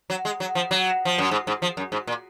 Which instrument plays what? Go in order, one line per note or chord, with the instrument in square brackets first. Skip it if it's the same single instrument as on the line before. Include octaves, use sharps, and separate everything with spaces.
[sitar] F#3
G#3
F#3
F3
F#3
F3
F#2
G#2
G#2
F3
F#2
G#2
A#2